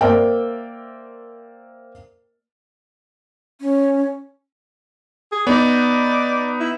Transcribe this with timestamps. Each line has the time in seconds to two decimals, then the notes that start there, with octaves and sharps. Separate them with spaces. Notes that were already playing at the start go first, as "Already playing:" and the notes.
0.01 A#3 A#4 C5 D5 E5 G5
3.61 C#4
5.32 G#4
5.47 B3 D#4 D5
6.60 E4